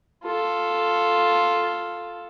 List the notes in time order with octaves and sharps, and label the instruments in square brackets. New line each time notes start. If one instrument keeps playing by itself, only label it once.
[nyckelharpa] F4 A4